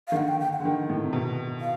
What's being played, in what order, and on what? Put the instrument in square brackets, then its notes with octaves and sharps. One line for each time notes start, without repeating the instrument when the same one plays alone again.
[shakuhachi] F5
[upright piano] D#3
[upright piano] D3 [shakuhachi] F#5
[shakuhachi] G5
G5
F#5
[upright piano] D3
D#3
A2
C3
B2
[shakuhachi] F5